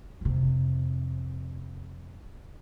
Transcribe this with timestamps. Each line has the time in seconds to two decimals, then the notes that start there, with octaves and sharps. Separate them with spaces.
0.21 F2 C3